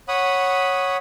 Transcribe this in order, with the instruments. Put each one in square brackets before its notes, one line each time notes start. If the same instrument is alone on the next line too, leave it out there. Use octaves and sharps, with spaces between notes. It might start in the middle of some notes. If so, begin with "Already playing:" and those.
[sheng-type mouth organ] C#5 F#5 B5 D#6